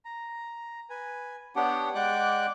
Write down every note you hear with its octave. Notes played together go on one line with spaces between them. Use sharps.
A#5
B4 G#5
B3 D4 G4 C#5 F#5 G5
G#3 D5 F#5 G5 D6 F#6